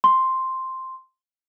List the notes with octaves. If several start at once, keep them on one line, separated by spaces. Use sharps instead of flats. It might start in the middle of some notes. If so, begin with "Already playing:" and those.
C6